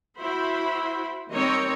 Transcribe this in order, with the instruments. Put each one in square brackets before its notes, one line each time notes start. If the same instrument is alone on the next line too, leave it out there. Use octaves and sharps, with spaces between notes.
[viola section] E4 F#4 C5 B5
D#3 G3 C4 C#5 D#5 A#5